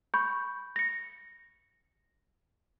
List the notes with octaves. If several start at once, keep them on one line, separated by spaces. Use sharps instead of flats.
B5 C#6 G6
A#6 C#7